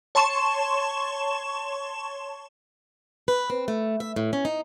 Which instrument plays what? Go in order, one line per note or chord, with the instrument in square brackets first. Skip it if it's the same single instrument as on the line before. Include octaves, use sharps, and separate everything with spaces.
[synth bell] C#5 A5 C6 C#6 E7
[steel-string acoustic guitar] B4
C4
A3
E5
A2
C#4
D#4